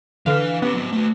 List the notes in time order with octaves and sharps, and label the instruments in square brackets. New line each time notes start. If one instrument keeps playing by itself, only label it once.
[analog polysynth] D3 F5 [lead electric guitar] E3 B4
[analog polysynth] B3 [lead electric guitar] C#4 G4
[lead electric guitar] F#3 C4
A3 F#4